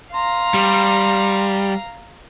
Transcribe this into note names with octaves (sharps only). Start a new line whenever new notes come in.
F5 A#5 C6
G3